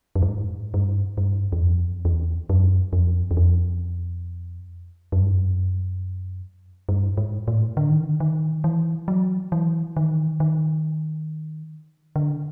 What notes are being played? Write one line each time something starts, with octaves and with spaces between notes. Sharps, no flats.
F#2
G2
G#2
G2
G2
E2
F2
E2
F#2
F2
E2
F2
F#2
G2
F#2
G2
G#2
A2
D3
D#3
D3
D#3
E3
F#3
E3
D#3
D#3
D3